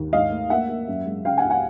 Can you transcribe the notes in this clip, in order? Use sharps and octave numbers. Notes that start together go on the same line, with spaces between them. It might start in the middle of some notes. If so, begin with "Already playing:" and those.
Already playing: D#2
G#2 D#5 F5
A3
A#3 E5 F#5
A#3
F#2
G#3
C#3 F5 G5
F#5 G#5
C#2
F#5 G#5